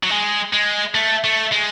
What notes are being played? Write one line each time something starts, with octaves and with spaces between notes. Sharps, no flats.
F#3
G#3
G#3
A3
A3
G#3